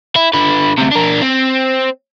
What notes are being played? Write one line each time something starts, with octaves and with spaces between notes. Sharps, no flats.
E4
D3 B4
D2 C3
D4 A#4
C4